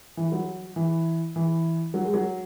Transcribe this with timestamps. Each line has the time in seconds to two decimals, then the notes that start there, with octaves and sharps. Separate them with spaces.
0.17 E3
0.32 F#3
0.76 E3
1.36 E3
1.94 F#3
2.05 G#3
2.14 F#3